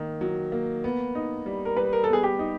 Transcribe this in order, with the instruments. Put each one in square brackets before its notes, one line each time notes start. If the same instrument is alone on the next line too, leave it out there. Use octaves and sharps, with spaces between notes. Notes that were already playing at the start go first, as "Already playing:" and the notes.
Already playing: [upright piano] D#3 A#3
F#3
A#3
B3
D#4
G3
[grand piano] A#4
[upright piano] G3 [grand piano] B4
[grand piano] A#4
[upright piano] B3 [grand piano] A4
[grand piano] G#4
G4
[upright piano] D#4